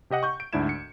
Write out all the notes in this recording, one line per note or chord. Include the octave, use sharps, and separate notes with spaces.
C3 G4 D#5 F#5
C#6 G6
D7
D2 G#2 D4 E4 G#6 E7
C#7